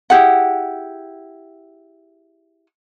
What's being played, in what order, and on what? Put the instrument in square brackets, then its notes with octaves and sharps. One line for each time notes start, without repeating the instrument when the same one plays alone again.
[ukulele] E4 G4 G#4 F#5